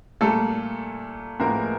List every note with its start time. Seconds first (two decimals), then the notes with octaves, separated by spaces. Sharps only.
0.21 A#2 G3 A3 A#3 A4
1.40 A2 F3 G#3 A#3 B3 A#4